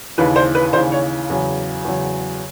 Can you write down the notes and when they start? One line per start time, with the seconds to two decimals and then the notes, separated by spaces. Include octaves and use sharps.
0.18 D#2 C#3 E3 B4
0.36 C5
0.55 B4
0.73 D#2 C#3 E3 C5
0.92 C#5
1.30 E2 C#3 F#3
1.85 E2 C#3 F#3